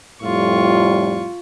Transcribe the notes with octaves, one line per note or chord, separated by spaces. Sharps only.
F2 A2 G3 F4 C#6